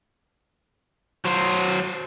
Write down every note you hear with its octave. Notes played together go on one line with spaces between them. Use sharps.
F#3 C5